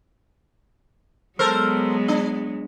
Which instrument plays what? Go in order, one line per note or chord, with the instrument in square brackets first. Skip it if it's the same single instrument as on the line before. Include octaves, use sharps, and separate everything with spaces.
[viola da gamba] F#3 G#3 B3 [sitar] A4 A#4 C5
[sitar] D4